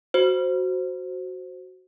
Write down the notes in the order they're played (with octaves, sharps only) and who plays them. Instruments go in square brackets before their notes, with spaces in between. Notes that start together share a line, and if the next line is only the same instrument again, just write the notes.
[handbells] F#4 C5